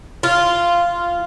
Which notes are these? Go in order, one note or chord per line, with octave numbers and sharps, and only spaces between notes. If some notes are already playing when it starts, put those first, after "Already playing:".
F4